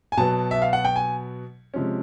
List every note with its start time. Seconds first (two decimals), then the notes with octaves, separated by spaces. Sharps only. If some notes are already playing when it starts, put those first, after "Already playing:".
0.12 G#5
0.17 B2 F#3 B3 A5
0.51 E5
0.62 F5
0.73 F#5
0.85 G5
0.96 G#5
1.74 C3 F3 G#3 C#4